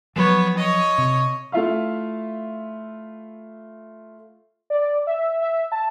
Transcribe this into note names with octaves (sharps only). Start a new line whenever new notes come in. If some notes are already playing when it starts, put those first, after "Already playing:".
F3 F#3 B3 C#5
C#5 D#5
C3
A3 E4 F4 E5 F5
D5
E5
E5
A5